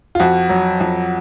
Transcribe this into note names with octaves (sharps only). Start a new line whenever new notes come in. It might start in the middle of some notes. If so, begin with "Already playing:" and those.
F4
F2 F#4
F#3
F2